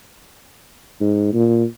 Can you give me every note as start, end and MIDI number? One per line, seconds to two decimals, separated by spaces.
1.00 1.32 44
1.33 1.64 46